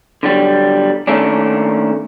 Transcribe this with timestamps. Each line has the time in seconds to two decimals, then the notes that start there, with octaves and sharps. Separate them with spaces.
0.23 D3 F#3 G3
1.07 D#3 A3 A#3 C#4 D4